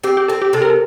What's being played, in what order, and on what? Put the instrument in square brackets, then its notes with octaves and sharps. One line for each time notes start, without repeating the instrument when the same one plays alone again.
[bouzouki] C4 [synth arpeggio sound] G4
[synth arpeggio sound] G4
[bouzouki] C4 [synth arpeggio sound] A4
[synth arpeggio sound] G4
[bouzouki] C3 [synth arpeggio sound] A4
[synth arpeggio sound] A#4
A4